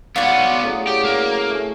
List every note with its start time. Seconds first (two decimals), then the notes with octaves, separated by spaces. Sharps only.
0.16 B3 F4 F#4 C#5 D5
0.63 A2 C#3 F#3
0.87 G4
1.04 A#3
1.50 A3 C#4